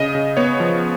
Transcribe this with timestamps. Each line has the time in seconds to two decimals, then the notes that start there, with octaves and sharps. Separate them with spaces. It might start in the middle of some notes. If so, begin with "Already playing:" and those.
Already playing: C#3 D#5
0.15 C#3
0.37 B3 C#5
0.60 F3